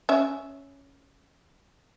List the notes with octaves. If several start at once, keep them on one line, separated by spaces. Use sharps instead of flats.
C#4 E5